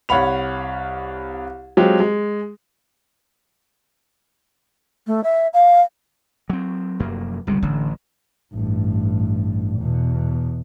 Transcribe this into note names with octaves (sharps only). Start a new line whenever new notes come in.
C2 C#5 F5 F#5 B5 F7
F#3 G#3 C4 F4 G4
G#3
A3
E5
F5
F#3 C4
F1 F#2 A#3
G1 C#2 C3 G3
A1 D3
A1 G2
E2 B2